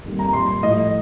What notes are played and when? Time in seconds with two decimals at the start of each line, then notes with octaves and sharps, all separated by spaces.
0.06 F2 D#3 G3 A#3
0.19 A#5
0.33 A#2 G3 A#3 C6
0.62 A2 F3 A3 D#5